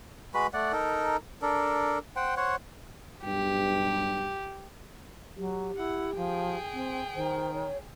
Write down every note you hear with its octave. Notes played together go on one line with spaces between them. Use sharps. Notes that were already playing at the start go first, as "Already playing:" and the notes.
G#3 F#4 B4 B5
A3 D5 F#5
D#4 A4 A#4
D4 A4 A#4
C5 F#5 G5
C5 C#5 F#5
B1 G2 G4
F#3 G4
E4 F#5
F3 G#4 G5
C4
D#3 C5
C#5